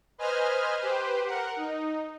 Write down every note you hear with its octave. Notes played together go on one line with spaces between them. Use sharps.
B4 C5 D#5 G#5 F6
G4 B4 C5
A#4 F#5
D#4